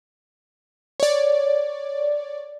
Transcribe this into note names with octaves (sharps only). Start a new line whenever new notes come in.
C#5 D5